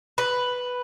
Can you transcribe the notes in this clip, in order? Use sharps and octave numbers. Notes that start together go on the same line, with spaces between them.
B4